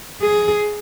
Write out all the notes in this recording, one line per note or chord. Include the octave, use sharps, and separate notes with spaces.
G#4